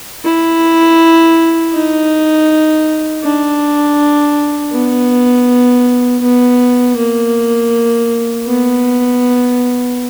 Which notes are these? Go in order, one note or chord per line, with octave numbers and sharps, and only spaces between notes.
E4
D#4
D4
B3
B3
A#3
B3